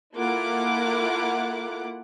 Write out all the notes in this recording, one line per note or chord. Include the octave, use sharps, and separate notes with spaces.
A#3 E4 F4 A4 F#5 D6